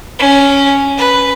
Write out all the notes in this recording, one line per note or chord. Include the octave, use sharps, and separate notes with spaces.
C#4
B4